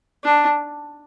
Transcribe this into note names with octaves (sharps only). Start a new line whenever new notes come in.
D4